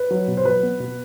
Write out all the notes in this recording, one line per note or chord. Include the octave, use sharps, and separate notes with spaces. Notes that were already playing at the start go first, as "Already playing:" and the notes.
Already playing: B4
F#3
B2
C5
F#3 B4
B3
B2